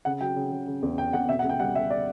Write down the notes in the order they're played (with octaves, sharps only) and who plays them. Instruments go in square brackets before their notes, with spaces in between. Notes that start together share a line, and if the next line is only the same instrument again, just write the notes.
[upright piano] C#3 F#5
F#3 G5
C#3
C#3
C#3
E2
C#3 G5
E2 F#5
B2 E5
F#5
C#2
G5
G3 F#5
G3 E5
D5